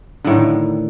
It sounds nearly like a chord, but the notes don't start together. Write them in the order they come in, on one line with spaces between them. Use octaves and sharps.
D3 A2 D#3